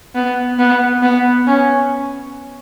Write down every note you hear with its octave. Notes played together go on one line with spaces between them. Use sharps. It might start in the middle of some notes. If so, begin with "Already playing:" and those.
B3
B3
B3
C#4